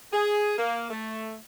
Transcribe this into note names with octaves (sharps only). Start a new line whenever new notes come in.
G#4
A#3
A3